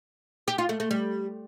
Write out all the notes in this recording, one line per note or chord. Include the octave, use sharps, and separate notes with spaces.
G4
F4
A3
A3
G3